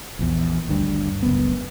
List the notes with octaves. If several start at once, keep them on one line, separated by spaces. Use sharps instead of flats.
A#1 E2
G#1 D2 G2
F#1 C#2 F#2 B3